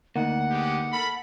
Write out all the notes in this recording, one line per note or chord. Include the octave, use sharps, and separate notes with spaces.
D2 A#3 D#4 F#5
G#3 B3 G4
A4 A#4 B5